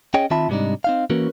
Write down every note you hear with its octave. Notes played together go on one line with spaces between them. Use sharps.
C#4 G#4 C#5 D#5 G5
D#3 C4 F4 E5 A5 B5
G#2 C3 G3 C4 D4 D#4
C4 D#4 F5
E3 A#3 C#4 F#4 A#4 B4